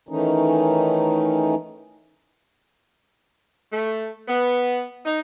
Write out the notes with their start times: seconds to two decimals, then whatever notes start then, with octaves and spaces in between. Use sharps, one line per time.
0.09 D#3 E3 A3 C#4 D#4
3.72 A3
4.28 B3
5.05 D#4